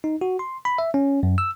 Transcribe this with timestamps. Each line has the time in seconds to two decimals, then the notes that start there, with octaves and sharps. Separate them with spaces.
0.04 D#4
0.21 F#4
0.39 C6
0.65 B5
0.78 E5
0.94 C#4
1.23 F#2
1.38 E6